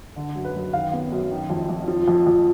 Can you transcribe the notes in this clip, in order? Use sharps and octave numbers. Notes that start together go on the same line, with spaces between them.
D3
F#2
B4
F#2
D#3 F5
B3
F#2
D#3
F2
F2
F3
F2
F2